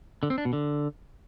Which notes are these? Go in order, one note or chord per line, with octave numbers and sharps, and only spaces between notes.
D3
C4
D4
B2
D3